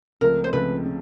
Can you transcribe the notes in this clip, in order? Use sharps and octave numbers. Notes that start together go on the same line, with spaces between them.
C#2 C#3 F3 A3 C4 A#4
C5
C#2 C#3 F3 A3 C4 B4
C#3